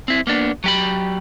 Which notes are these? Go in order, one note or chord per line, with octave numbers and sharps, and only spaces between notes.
C4 E4
A#3 B3 D4
F#3 G4 B5